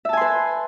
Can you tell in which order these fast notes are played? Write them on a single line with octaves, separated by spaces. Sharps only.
E5 A5 G#5 C6 B4